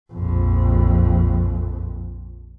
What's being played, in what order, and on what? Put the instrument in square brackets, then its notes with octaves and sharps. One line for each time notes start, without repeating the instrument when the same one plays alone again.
[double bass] A#1 F2